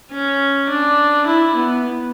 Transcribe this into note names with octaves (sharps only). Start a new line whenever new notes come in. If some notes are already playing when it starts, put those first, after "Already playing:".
C#4
D4
E4
B3